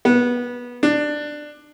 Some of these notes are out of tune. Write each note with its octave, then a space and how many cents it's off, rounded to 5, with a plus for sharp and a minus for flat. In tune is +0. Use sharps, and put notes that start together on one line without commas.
B3 -20
D4 +15